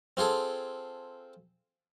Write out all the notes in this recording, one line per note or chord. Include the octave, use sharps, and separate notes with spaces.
C4 F4 G#4 A4